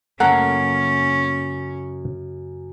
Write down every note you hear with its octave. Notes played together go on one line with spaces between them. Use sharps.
F#2 C#3 A#3 C#4 A4 F#5 A#5